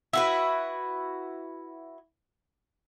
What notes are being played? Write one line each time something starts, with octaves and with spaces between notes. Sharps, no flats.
E4 F#4 B4